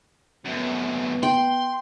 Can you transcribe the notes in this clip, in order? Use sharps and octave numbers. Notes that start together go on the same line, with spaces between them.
F#2 A2 B3
G5 C6